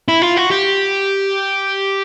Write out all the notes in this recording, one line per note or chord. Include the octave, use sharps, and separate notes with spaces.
E4
F4
F#4
G4